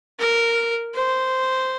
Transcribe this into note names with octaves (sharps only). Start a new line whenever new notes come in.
A#4
C5